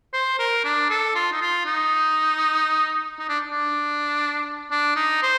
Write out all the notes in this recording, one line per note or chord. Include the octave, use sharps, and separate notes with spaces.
C5
A#4
D4
A4
F4
D#4
F4
D#4
D#4
D4
D4
D4
D#4
C5